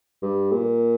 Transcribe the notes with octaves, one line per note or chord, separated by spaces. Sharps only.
G2
A#2